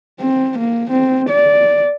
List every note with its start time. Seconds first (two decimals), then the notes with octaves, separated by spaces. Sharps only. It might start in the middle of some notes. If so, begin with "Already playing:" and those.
0.20 C4
0.58 A#3
0.90 C4
1.29 D5